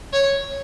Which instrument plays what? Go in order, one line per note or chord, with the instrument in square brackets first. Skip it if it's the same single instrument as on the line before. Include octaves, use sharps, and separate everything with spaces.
[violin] C#5